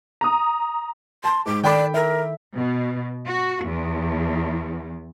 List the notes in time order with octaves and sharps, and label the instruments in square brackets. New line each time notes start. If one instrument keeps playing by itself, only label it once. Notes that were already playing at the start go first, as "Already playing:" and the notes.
[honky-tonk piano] A#5 D#6
[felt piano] A5 [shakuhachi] C6
[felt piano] G#2 [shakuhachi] D6
[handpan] D#3 A4 [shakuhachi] D5 [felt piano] G5 B5 D6
[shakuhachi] A#4 [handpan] E5
[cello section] B2
F#4
E2